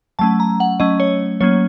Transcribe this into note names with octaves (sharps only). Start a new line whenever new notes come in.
F#3 A3 C#4 A5
A#5
F#5
F#3 A3 C#4 D#5
C#5
F#3 A#3 C#4 C#5